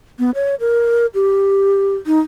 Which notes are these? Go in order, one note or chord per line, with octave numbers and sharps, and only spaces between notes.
B3
C#5
A#4
G4
D#4